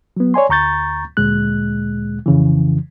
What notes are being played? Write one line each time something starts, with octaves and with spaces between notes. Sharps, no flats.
F#3 B3
C#5 D5 G#5 C6
D2 A#5 C#6 G6 A6
D2 A#2 G#3 F#6
F2 C#3 E3